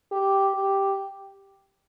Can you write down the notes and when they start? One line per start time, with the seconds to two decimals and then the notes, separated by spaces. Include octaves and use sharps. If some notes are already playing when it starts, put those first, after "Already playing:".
0.12 G4
0.55 G4